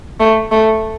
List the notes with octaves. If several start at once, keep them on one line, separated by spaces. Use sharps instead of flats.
A3
A3